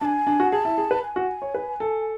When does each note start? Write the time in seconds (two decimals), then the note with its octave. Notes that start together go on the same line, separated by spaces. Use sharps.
0.01 D4 G#5 A5
0.27 D4
0.40 F#4
0.52 G#4 A5
0.65 E4
0.78 G#4
0.91 B4
1.03 G#5
1.16 F#4
1.42 C#5
1.54 B4
1.80 A4